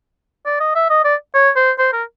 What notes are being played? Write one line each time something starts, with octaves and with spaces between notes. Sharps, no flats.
D5
D#5
E5
D#5
D5
C#5
C5
C5
A#4